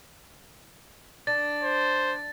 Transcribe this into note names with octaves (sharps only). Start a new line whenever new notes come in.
D4 A6
C5